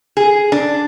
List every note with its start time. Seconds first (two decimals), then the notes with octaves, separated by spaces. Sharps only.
0.17 G#4
0.52 D4